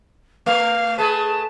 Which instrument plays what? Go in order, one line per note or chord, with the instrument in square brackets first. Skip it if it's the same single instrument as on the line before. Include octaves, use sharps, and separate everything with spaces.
[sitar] A3 [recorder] F5
[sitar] A3 G#4 B4 [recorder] A5